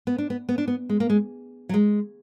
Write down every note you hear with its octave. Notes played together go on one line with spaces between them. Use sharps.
B3
D4
B3
B3
D4
B3
G#3
A#3
G#3
F#3
G#3